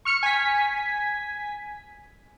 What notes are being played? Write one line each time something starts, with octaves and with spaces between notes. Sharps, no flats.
C#6 F6 C#7
G#5 B6